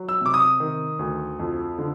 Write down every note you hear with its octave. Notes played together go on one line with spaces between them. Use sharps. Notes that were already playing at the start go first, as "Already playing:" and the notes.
Already playing: F#3
E6
C3 D6
D#6
D#3
D2
F2
D3